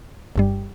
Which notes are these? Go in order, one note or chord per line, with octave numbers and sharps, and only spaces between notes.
G1 G2 G3